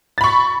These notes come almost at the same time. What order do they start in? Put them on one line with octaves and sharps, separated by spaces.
A6 B5 C#6